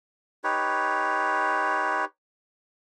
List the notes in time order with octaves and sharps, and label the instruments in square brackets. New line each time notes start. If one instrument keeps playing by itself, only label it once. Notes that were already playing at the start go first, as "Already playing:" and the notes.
[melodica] D#4 G4 B4 C#5